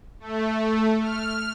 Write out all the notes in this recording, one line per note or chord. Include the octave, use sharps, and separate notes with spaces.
A3
F6